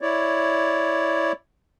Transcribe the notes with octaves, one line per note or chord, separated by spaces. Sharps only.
E4 C#5 D5